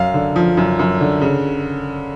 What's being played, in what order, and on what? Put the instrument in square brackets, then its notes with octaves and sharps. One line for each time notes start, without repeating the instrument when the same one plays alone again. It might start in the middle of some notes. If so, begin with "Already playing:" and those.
Already playing: [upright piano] F#2 F5
D3
F3
F#2
F#2
D3
C#3